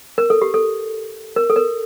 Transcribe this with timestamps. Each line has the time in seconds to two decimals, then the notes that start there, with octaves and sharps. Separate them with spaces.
0.18 A#4
0.30 A4
0.42 G4
0.54 A4
1.36 A#4
1.50 A4
1.56 A#4